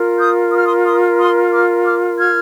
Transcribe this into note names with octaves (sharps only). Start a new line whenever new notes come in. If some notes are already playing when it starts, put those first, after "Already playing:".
Already playing: F4 A#4
D#6 G6
D#6
F6
C6 D#6
C6 D#6
C6 D#6
D6 F6
D6 F6
F6 G#6